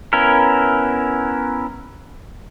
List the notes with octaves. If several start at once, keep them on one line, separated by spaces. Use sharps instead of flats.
B3 C#4 E4 A#4